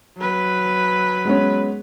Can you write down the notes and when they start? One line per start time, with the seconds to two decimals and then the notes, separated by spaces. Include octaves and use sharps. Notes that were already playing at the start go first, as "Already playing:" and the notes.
0.17 F#3 B4
1.25 G#3 B3 C#4